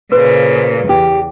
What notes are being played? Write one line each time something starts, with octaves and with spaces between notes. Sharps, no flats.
A#2 C#3 B4 C5
E2 G4